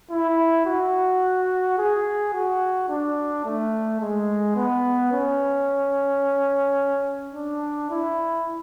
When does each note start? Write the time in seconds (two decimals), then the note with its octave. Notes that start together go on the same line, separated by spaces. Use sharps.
0.10 E4
0.66 F#4
1.78 G#4
2.33 F#4
2.89 D4
3.45 A3
4.01 G#3
4.56 B3
5.12 C#4
7.35 D4
7.90 E4